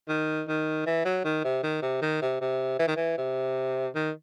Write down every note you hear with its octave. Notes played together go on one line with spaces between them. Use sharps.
D#3
D#3
E3
F#3
D#3
C3
D#3
C3
D#3
C3
C3
E3
D#3
E3
C3
D#3